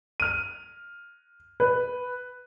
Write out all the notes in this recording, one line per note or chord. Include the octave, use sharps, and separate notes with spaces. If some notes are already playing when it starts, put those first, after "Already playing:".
F6 D#7
B4